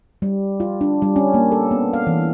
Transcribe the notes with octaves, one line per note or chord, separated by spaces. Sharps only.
G3
F4
D4
G3
C#4
A#3
A4
B3
F5
E3